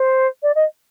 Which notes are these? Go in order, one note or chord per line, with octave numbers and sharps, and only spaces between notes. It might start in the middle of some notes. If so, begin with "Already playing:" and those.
Already playing: C5
D5
D#5